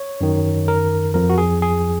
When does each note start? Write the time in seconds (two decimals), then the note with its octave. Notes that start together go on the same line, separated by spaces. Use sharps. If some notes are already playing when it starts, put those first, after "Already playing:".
Already playing: C#5
0.21 F#2 D#3
0.68 A#4
1.14 F2 F3 A#4
1.30 F#4
1.38 G#4
1.62 G#4